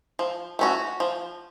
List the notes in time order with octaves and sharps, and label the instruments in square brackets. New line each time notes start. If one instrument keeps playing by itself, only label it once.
[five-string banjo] F3
A3 C#4 F#4
F3